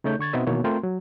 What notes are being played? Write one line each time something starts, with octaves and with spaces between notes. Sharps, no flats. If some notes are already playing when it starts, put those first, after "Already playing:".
C#3 A3 D#4 C#5 G6
D3 C#6 G#6 A6
B2 B3 C4 D#4 D#5 E5
B2 D#3 E3 A#3 C#5
A3 C4 F4 A#4 G5 C6
F#3